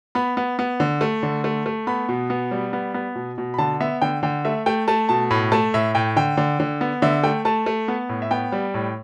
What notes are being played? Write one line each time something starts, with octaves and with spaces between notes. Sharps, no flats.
B3 B5
B3
B3
D3
A3
D3
A3
A3
B3 B5
B2
B3
G3
B3
B3
B2
B2
B5
D3 A5
B3 E5
D3 G5
D3 G5
A3 E5
A3 G5
A3 A5
B2 A5
A2 B5
A3 A5
A2 E5
A2 G5
D3 G5
D3
D3
B3
D3 E5
A3 G5
A3 A5
A3
B3
A2
E5
B3 G5
G3
A2